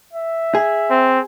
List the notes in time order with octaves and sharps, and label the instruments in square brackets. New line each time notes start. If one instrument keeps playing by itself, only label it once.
[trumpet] E5
[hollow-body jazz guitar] G#4
[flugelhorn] C4